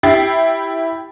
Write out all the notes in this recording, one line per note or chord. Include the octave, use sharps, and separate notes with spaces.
E4 G4 G5 A6 C7